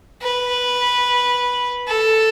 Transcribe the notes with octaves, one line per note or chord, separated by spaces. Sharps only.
B4
A4